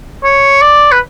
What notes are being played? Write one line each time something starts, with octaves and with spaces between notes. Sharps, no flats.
C#5
D5
B4